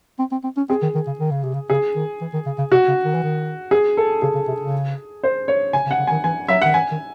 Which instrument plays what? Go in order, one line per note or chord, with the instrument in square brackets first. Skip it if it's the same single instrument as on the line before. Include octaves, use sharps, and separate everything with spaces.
[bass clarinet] C4
C4
C4
C#4
[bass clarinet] C4 [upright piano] G#4
[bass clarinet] D#3
D#3
C#3
D#3
C#3
C3
C#3
[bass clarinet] C#3 [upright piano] G#4
[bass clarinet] D#3
E3
D#3
C#3
C#3
[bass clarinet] C3 [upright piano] F#4
[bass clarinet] C#3
D#3
E3
D#3
[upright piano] G#4
A4
[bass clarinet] C#3 [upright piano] G#4
[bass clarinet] C#3
C3
C#3
[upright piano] C5
C#5
[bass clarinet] C#3 [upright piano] G#5
[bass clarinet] C#3
[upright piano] F#5
[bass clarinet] C#3
[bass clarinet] D#3 [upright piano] G#5
[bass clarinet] E3 [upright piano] G#5
[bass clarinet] F#3 [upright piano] E5
[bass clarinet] D#3 [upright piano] F#5
[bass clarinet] E3 [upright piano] G#5
[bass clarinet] D#3